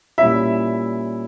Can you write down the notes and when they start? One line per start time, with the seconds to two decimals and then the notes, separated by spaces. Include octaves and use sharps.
0.18 A#2 G3 C#4 E4 E5